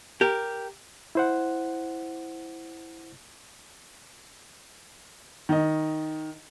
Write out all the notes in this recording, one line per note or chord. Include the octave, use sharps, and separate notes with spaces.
G4 A#4
E4 C5 F#5
D#3 D#5